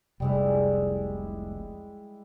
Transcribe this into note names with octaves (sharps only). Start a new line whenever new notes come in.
F1 C2 G3 G#3 E4